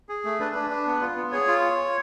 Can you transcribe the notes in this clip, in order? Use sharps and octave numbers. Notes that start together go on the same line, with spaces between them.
G#4
A3
D4 B4
D4
D4
B3
F4
B3
G#4 C#5
F4